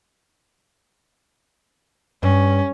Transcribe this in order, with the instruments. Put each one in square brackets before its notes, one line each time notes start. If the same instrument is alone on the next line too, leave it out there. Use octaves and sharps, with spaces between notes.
[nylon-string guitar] G2 [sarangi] C#4